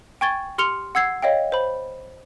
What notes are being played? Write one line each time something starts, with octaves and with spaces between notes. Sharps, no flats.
G5 G#5 C#6 G#6 A6 G7
G4 C6 F6 C#7 F7 G7
F#5 E6 G#6 C7
C#5 D#5 F5 G5
C5 B5